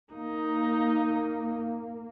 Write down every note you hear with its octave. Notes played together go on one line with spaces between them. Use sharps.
A#3 D#4